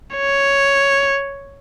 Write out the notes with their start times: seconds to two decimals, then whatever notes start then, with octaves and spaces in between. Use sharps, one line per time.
0.16 C#5